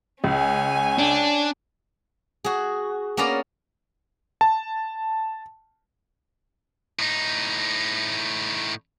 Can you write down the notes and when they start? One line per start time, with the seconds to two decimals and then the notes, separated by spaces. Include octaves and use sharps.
0.24 C#2 C#4 G#5
0.99 D4
2.44 F#4 G#4
3.17 A#3 B3 C#4 A#4 D5 A#5
4.41 A5
6.99 A2 D#4